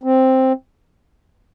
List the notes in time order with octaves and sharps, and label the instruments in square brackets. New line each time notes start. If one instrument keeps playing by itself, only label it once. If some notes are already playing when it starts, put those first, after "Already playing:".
[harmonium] C4